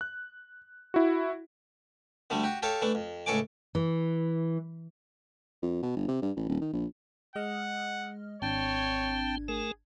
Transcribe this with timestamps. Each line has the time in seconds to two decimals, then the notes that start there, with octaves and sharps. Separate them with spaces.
0.01 F#6
0.94 E4 F#4
2.30 D2 D3 G3 A3
2.44 F#4 G4
2.62 G4 A4 C#5 F5 A5
2.82 E3 A3 D4
2.95 F2
3.26 C#2 A2 A4 C#5 G#5 D6
3.75 E3
5.63 F2
5.83 B2
5.96 G1
6.08 C3
6.22 G2
6.36 A1
6.49 D#1
6.61 D#3
6.73 A#1
7.36 G#3 D#5 F#5 F6
8.42 G#1 C4 D4 C#5 G5 A5 G#6
9.48 A3 G#4 A#4